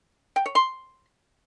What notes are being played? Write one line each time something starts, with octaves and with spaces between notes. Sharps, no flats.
G5
C#5
C6